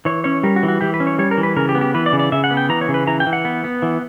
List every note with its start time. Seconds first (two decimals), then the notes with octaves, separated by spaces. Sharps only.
0.05 E3 C#5
0.24 C#4 C#5
0.43 G3 A#4
0.56 F#4
0.63 E3
0.68 F#4
0.81 E3 G4
0.94 B4
1.00 C#4
1.07 C#5
1.19 G3 C#5
1.31 A#4
1.37 E3
1.43 B4
1.56 C#3 A#4
1.69 G4
1.75 B3
1.81 G4
1.94 E3 B4
2.06 D5
2.13 C#3
2.19 D5
2.32 C#3 E5
2.44 F#5
2.51 B3
2.57 G5
2.69 E3 A#5
2.81 C#5
2.88 C#3
2.94 B4
3.07 E3 A#5
3.20 G5
3.26 E3
3.33 F#5
3.45 B3
3.64 B3
3.82 E3